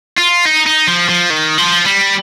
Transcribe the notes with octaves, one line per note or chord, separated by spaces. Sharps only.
F4
D#4
D#4
F3
F3
D#3
F3
G3